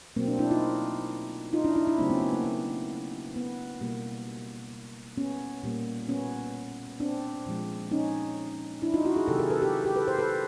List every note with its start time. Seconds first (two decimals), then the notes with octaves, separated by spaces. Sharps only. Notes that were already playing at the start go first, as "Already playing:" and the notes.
0.16 B2 F#3 A3 A#3 C4
0.28 C4 D4
0.39 D4 E4
0.51 D#4 F4
1.53 D#4 F4
1.65 D4 E4
1.76 D4 E4
1.87 D4 E4
1.99 C#3 F#3 A3 C4 D4
2.10 B3 C#4
2.21 B3
2.33 A#3
2.44 B3
3.36 B3
3.81 B2 G3 A#3
5.17 B3 C#4
5.63 A#2 G3 A#3
6.09 B3 C#4
7.00 C4 D4
7.46 A#2 F3 G#3
7.91 C#4 D#4
8.82 D4 E4
8.94 D#4 F4
9.05 E4 F#4
9.16 F#4 G#4
9.28 C3 D#3 F#3 G4 A4
9.39 G#4 A#4
9.50 A4 B4
9.62 G4 A4
9.85 G4 A4
9.96 A4 B4
10.08 A#4 C5
10.19 A4 B4